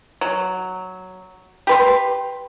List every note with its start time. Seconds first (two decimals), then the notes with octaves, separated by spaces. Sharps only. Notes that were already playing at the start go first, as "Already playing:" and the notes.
0.21 F#3
1.67 G4 B4 C6